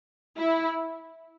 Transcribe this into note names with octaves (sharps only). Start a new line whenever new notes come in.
E4